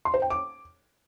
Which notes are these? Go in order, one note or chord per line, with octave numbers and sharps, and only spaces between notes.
C6
C5
G5
D6